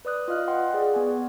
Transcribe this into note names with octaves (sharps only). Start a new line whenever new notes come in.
B4 D5 D#6 F#6
F4 D#5 F5 F6 F#6
D#5 F#5 G5 C6
G#4 D5
B3 G#5